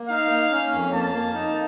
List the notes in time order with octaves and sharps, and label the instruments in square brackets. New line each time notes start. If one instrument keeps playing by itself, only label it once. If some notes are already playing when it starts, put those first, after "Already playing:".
Already playing: [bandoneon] A#3
[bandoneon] D#4 [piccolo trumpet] F5
[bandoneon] A#3
C#4
F2
[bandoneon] A#3 [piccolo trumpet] A5
[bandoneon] A#3
D#4